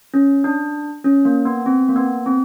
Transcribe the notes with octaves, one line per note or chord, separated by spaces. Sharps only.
C#4
D4
C#4
A#3
B3
C4
A#3
B3
C4